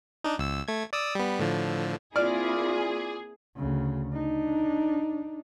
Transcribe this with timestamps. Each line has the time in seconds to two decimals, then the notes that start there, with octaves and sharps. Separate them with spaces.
0.24 D4 D#4
0.38 C#2 E6
0.68 A3 G#6
0.93 D5 D#6 E6
1.15 G3 B3
1.39 A2 D3 F3
2.16 A#3 C4 E4 F4 G#4 D5 D6 F6
3.56 D2 C#3
4.13 D4 D#4